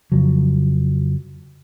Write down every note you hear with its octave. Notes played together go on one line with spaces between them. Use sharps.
F2 C#3 F3 F#3